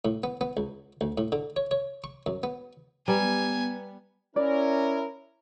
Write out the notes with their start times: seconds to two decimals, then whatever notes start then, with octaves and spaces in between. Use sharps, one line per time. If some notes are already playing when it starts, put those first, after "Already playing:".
0.05 A2
0.24 B3
0.41 B3
0.57 C#2
1.01 D2
1.18 A2
1.32 D3
1.56 C#5
1.71 C#5
2.04 C#6
2.26 F#2
2.43 B3
3.08 G3 B3 B4 G#5 A#5
4.36 C#4 E4 A#4 D5